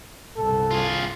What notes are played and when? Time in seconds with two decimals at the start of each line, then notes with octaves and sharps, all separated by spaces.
0.37 G1 C2 A4
0.71 F4 G#4